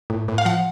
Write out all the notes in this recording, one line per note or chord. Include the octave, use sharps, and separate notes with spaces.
A2
A2
F5
F3 F#5